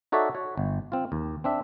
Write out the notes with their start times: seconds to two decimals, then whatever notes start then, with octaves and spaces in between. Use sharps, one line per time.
0.12 D#4 F#4 A4 C#5 D5 E5
0.35 F#4 C#5
0.57 G1
0.92 C4 F4
1.12 D#2
1.44 C4 D4 E5